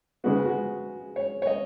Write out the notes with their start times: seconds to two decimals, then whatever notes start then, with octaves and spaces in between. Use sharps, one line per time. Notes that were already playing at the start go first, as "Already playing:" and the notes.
0.24 C#3 G#3 B3 F#4
0.35 G#4
0.46 F#4
1.16 C#5
1.42 C#5
1.47 D#5